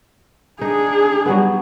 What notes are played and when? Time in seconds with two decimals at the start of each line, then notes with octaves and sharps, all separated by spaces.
0.61 D4 D#4 G#4
1.26 F#3 G3 B3